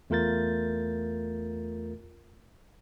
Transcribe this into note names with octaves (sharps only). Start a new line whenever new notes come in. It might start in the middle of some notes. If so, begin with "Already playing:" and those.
E2 A3 F4 A#4 G6 A6